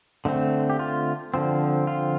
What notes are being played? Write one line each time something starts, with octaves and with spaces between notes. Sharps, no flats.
D3 A3 C4
G4
F4
D3 F3 C4
F4